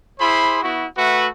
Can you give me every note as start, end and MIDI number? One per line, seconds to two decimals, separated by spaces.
0.20 0.62 64
0.20 0.62 68
0.20 0.62 72
0.20 0.62 83
0.20 0.62 84
0.62 0.86 59
0.62 0.86 64
0.62 0.86 66
0.97 1.27 57
0.97 1.27 66
0.97 1.27 71
0.97 1.27 76
0.97 1.27 78